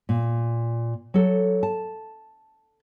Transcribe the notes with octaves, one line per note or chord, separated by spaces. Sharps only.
A#2
F#3 A4
A5